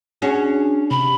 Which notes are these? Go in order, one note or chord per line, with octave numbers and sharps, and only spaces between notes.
C#4 D4 F#4 G#4
C3 B5